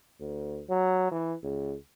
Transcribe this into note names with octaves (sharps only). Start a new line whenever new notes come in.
D2
F#3
E3
C#2